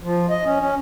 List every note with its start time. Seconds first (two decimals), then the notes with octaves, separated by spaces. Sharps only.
0.03 F3
0.29 D#5
0.45 C#4
0.60 C#4